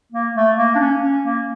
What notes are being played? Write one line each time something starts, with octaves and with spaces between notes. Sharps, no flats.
A#3
A3
A#3
D4
C#4
C#4
A#3